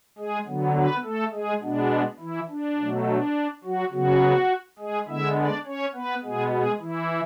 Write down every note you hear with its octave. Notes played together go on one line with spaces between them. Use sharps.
G#3 G#4
D3 F#3 B3
B3 B4
A3 A4
G#3 G#4
B2 G#3 B3 D4
E3 E4
D4
B2 F#3 A3
D4
F#3 F#4
C#3 F#3 B3 F#4
G#3 G#4
D3 G#3 B3 E4 E5
D4 D5
C#4 C#5
B3 B4
B2 G#3 B3 G#4
G#3 G#4
E3 E4